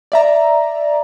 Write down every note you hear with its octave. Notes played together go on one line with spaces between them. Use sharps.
D5 E5 A#5